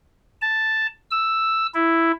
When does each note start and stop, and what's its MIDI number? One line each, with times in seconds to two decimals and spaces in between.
0.42 0.87 81
1.11 1.66 88
1.74 2.12 64